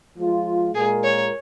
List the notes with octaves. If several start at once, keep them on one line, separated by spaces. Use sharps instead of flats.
F3 G#3 F4
A#2 G#3 F4 G#4 A#4
C#5